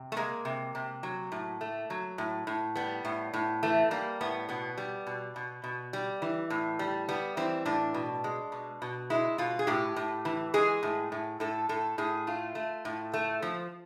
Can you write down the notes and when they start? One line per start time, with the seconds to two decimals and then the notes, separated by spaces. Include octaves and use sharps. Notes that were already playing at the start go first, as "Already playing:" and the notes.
Already playing: C3
0.12 A3
0.16 G#3 A#3
0.45 C3
0.75 C3
1.03 F#3
1.32 A2
1.61 A3
1.90 F#3
2.18 A2
2.47 A2
2.76 G3 B3
3.05 A2
3.34 A2
3.63 E3 A3
3.91 G3 A#3
4.21 A2 B3
4.49 B2 B3
4.78 G3
5.07 B2
5.36 B2
5.64 B2
5.93 G3
6.22 E3
6.50 A2
6.79 G3
7.09 G3 B3
7.37 E3 C4
7.66 A2 D4
7.94 B2
8.24 G#3
8.52 B2
8.82 B2
9.10 G#3 E4
9.38 B2 F4
9.59 G#4
9.67 A2 G4
9.96 A2
10.25 E3
10.54 G#3 G#4
10.83 A2
11.12 A2
11.40 A2 A4
11.69 A2 A4
11.98 A2 G#4
12.27 A3 F4
12.55 A3
12.85 A2
13.14 A3
13.42 F3